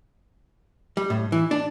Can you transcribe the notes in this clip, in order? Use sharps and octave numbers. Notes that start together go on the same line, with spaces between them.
G3
A2
E3
D4